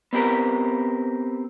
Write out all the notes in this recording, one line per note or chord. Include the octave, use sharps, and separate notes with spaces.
B3 C4 G4 A#4